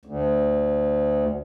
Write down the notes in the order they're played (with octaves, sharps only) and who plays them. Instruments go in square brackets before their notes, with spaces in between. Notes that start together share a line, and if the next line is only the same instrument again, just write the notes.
[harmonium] D2